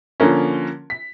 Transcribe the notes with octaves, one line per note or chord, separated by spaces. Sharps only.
D3 F3 A#3 C#4
B6